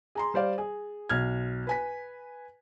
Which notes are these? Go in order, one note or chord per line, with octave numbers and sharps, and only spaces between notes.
G#4 A#5 C6
G3 C5 D5 F5
G#4
B1 F6 G#6
B4 G#5 B6